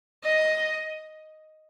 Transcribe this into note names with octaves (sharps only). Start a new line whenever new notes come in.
D#5